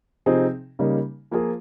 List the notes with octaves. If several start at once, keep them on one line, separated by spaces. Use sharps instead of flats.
C3 F3 C4 D#4 G#4
C#3 G3 A#3 D#4
F3 A#3 F4 G#4